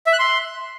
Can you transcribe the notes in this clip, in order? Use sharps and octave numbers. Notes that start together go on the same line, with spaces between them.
E5
F#6
C6